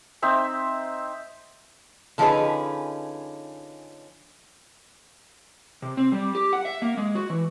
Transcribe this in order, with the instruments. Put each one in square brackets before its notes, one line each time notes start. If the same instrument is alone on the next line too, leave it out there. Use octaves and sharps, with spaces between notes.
[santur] C4 D#4 E5
[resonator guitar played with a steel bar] D3 F3 C#4 D#4 G#4 B4
[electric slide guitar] C3
C4
G3
G4
F#5
E5
A#3
G#3
F#4
E3